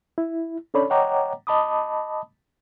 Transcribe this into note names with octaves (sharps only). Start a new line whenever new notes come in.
E4
C#4 D4 A4 C#5 D5 B5
C#5 D#5 F#5 G5 A#5 D6
D#5 A5 B5 D6 D#6